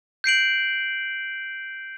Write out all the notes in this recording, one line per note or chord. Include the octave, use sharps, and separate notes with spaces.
G6 C7 D7 F#7